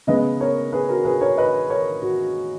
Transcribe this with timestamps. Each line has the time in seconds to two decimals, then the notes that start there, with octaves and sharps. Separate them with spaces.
0.07 C#3 G#3 B3 B4 D#5
0.40 A#4 C#5
0.72 G#4 B4
0.89 F#4 A#4
1.05 G#4 B4
1.21 A#4 C#5
1.37 B4 D#5
1.70 A#4 C#5
2.02 F#4